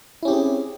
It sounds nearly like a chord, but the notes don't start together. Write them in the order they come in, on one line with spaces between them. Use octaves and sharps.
E4 C#4 G4 C4 G#4